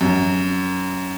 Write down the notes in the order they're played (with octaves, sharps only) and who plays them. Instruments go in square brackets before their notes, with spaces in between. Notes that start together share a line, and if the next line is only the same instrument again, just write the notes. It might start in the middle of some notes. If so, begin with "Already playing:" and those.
[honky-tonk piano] F#2